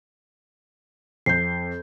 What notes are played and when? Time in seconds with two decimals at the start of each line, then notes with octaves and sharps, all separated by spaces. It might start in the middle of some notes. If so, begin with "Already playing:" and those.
1.26 F2 G6 C7